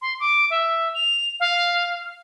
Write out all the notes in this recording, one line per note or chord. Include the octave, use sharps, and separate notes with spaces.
C6
D6
E5
F7
F5